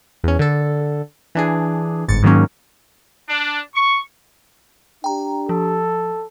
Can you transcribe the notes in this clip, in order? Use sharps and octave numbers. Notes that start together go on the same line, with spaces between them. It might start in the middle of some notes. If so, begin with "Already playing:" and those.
E2 C#4
D3 A4
E3 D4 G#4
G1 G#2 A6 C#7
G#2 D#3 F#3 A#3 C#4
D4
C#6
D4 G4 G5 A#5
F3 A4